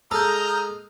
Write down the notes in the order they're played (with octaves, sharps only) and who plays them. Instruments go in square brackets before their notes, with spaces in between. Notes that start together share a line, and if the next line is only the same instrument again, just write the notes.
[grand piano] G#3 [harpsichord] A4 [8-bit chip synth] A#5 F6 G6 [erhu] D#6